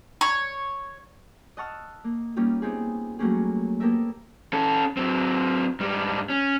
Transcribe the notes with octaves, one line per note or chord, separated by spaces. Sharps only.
C#5
D#5 F#5 A5 C#6 E6 F6
A#3
G3 A#3 C#4 D#4 F4 G4
B3 C4 D#4 G4 G#4
F#3 G3 A3 A#3 C#4 G#4
A#3 B3 G4 A4 A#4 E5
C#4 A4
F#3 C4
G#2 G3
C#4